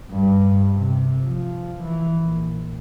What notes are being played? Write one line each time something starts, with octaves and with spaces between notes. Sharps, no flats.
G2
C3
F3
E3
A#1